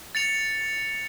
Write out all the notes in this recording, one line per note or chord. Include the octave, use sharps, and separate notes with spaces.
A6 C#7 F7